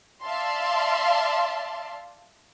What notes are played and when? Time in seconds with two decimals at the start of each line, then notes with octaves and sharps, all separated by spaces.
0.24 D5 E5 F5 A5 C6